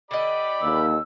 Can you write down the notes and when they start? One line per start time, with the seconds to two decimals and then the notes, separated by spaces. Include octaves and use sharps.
0.11 D3 G4 D5 D#5 B5
0.62 D#2 E6